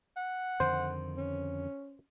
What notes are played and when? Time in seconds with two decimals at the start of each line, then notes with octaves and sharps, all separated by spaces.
0.17 F#5
0.60 F2 D3 D#3 C5
1.17 C#4